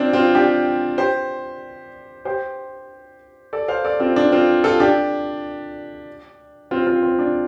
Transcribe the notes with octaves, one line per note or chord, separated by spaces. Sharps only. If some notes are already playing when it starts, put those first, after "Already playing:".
Already playing: C4 D4 F4
C4 F4
D4 G4
G4 C5
G4 C5
A4 D5
C5 F5
A4 D5
C4 F4
D4
C4 F4
F4 A4
D4 G4
C4 F4
C4 F4
C4
D4